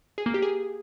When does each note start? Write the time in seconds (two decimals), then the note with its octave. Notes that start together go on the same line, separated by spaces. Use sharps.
0.18 G#4
0.26 A#3
0.34 G4
0.42 G#4